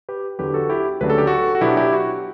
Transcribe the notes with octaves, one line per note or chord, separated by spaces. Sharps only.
G4 B4
E2 D3 F#3 G4 B4
F#4 A4
E4 G4
D2 C#3 F#3 A3 D4 B4
A4
G4
F#4 A4
F#4
B2 F#3 B3 D4 E4 G4
E4 G4
F#4